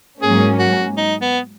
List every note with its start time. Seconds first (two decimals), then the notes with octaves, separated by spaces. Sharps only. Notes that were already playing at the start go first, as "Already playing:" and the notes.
0.22 G#2 F#3 A#3 C#4 G#4
0.59 F#4
0.97 D#4
1.21 B3